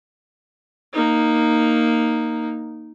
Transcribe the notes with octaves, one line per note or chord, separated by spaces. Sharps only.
A#3 D#4